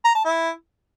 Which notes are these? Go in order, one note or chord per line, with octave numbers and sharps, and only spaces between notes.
A#5
A5
E4